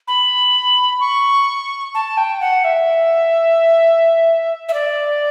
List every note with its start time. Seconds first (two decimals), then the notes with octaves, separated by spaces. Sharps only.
0.08 B5
1.00 C#6
1.95 A5
2.17 G5
2.41 F#5
2.64 E5
4.69 E5
4.74 D5